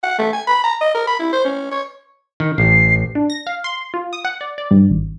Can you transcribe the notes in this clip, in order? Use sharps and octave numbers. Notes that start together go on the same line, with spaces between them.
F#5
A3
G#5
B5
A#5
D#5
A#4
B5
E4
C5
C#4
C#5
D#3
A1 C7
D4
A#6
F5
C6
F4
D#6
F#5
D5
D5
G2
G#1